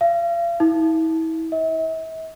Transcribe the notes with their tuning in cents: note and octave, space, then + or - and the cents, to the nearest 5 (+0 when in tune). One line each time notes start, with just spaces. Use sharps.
F5 -40
E4 -35
E5 -40